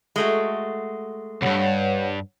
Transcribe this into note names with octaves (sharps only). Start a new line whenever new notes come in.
G#3 A3 F#4
C2 G2 C#5 F#5